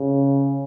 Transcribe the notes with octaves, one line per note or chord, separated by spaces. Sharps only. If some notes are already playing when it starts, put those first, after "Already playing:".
Already playing: C#3